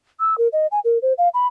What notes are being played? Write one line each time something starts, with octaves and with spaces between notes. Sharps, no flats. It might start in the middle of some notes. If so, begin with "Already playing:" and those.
E6
A#4
D#5
G#5
A#4
C5
F5
B5